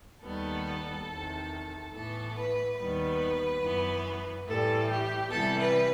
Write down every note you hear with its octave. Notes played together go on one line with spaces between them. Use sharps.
D#2 D#3 G3 B3 A4
E2 C3 D#3
A2 E3 B3 A4
B4
D#2 D#3 G3 B3 B4
F#2 E3 B3
A2 E3 G3 A4
G4
C3 E3 G3 B3 A4
B4